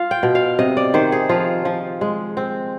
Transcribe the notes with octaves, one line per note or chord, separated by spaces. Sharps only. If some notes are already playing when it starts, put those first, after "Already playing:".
Already playing: F4 F5
G5
B2
F5
C3 D#5
D5
D#3 C5
G#4
F3 F4
F3
G#3
C4